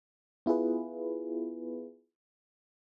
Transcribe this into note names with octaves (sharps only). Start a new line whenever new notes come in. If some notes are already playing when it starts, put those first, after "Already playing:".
B3 E4 F4 G#4 B4